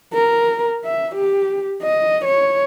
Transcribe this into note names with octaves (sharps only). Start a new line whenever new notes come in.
A#4
E5
G4
D#5
C#5